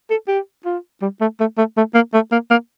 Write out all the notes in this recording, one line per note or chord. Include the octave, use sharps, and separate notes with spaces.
A4
G4
F4
G3
A3
A3
A3
A3
A#3
A3
A#3
A#3